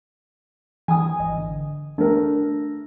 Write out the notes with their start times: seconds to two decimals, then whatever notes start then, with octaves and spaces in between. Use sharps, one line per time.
0.88 E3 G#5 D#6
1.19 G#1 D#5
1.37 D3
1.98 A3 D4 A#4